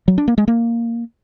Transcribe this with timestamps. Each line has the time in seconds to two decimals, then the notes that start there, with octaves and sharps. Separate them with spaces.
0.08 F#3
0.18 D4
0.28 A#3
0.38 G#3
0.48 A#3